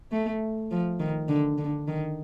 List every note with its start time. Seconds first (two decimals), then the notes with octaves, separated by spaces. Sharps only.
0.12 A3
0.71 F3
1.00 D#3
1.28 D3
1.58 D3
1.88 D#3